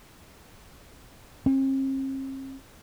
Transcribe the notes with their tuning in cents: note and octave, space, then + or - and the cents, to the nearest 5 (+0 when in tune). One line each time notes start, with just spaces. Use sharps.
C4 +45